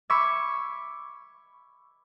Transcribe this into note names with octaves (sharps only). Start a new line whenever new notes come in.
B5 C#6 D6 E6 G#6